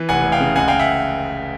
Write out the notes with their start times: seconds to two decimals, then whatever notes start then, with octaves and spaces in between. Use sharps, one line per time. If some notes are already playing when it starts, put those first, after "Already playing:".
Already playing: E3
0.09 F1 F#5 G#5
0.25 F1
0.32 F5 G5
0.40 C#3
0.56 C#2 F#5 G#5
0.68 C#2 F5 G5
0.79 E5 F#5